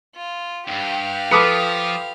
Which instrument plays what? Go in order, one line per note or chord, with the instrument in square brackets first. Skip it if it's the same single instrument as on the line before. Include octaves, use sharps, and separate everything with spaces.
[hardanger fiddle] F4
[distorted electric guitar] D2 G2 [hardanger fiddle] G4 F5
[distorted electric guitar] F3 [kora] F4 A4 B4 [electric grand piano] D6 D#6 C#7